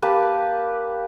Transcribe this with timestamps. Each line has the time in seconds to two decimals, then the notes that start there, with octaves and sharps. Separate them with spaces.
0.02 A#3 G4 B4 A5